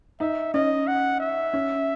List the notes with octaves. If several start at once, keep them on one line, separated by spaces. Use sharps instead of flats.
D#4 E5
C#4 D#5
F#5
E5
C#4